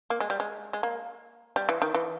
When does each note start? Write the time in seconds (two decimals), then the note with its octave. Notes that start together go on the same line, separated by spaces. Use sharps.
0.10 A#3
0.20 G#3
0.30 G3
0.40 G#3
0.73 G#3
0.83 A#3
1.56 G3
1.69 E3
1.82 D#3
1.94 E3